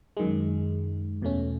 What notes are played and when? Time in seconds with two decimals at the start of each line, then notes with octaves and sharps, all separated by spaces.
0.17 F#2 D#3 G#3
1.22 E2 B2 A3 C#4